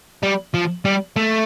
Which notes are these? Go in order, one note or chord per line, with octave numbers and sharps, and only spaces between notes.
G3
F3
G3
A3